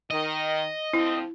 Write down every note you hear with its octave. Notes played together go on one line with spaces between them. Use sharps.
D#3 D#5
D2 F3 C4 E4